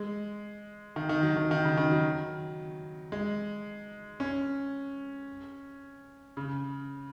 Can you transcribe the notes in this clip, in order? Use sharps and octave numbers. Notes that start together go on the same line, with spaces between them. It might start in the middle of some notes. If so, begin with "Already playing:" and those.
Already playing: G#3
D#3
D#3
F#3
D#3
D#3
C#3
D#3
F#3
G#3
C#4
C#3